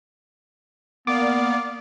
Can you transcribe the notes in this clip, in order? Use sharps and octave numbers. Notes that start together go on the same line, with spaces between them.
A#3 B3 D5 F5 D6